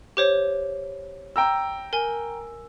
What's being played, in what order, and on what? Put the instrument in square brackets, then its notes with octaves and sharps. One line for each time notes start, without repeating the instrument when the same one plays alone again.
[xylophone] G4 C5 C#5
[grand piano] G5 A#5 E6
[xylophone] A#4 G#5